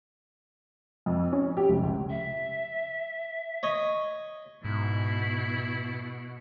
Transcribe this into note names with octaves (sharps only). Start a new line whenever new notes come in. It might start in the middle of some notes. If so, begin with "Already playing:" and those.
F2
C#4
G4
F1
C#2
E5
C#5 D#5
G#2 B2 E4